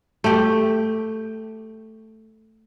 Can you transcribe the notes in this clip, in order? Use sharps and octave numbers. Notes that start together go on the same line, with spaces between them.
A3 G4